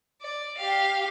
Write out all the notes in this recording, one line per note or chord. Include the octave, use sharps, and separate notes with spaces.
D5
G4 F5